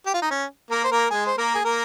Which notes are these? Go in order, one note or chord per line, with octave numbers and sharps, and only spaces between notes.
G4
F4
D#4
C#4
A#3 A#4
C5
A#3 A#4
G#3 G#4
C5
A#3 A#4
G#4
A#3 A#4